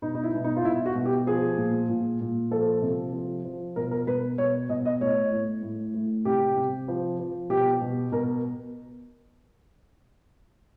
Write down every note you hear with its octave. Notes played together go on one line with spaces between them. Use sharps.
B2 D#4
D#4
E4
B2
D#4
F4
B2 E4
F#4
B2
G4
F3 G#4
A#2
A#2
A#2
F3 A4
C3
F3
F3
B2 A#4
A#4
B2 B4
B2 C#5
B2 D#5
D#5
A2 C#5
A2
A2
A2
C3 G4
C3
F3
F3
B2 G4
B2
B2 A#4